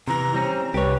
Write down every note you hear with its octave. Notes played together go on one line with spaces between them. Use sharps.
C3 E3 A#5
G3 C4 C#4
C2 G4 B4 C#5